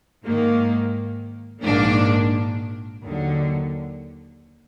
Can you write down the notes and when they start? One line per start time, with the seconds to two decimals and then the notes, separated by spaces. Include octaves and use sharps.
0.24 G#2 D#3 A#3
1.63 A#1 G#2 D#3 A#3 D4
3.03 D#2 D3 F#3